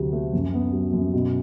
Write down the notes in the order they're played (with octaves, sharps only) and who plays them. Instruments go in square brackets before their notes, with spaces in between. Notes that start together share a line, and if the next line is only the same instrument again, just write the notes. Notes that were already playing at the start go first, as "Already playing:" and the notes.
Already playing: [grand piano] D2 C3 F#3
A3
F#2
B3
F#3
F#2
B2